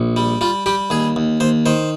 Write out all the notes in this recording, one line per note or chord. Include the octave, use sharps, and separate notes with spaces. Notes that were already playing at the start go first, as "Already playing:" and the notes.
Already playing: A#1
G3
G3 F4
G3 G4
D#2 G#4
D#2
D#2 C5
D#3 C5